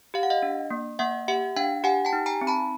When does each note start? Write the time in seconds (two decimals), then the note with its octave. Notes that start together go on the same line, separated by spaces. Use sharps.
0.14 G4 F5
0.23 F#5
0.30 D#5 F5
0.43 D4
0.71 A#3
0.99 A#3 E5 F#5
1.28 G4 E5 F#5
1.56 D4 F5 G5
1.84 G4 F#5 G#5
2.05 G5 A5
2.13 D#4
2.26 G#5 A#5
2.41 C4
2.47 A5 B5